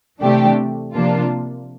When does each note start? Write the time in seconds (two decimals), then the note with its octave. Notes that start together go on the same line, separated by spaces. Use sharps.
0.20 C3 E3 A3 D4 G4
0.94 C3 F3 A#3 D4 F4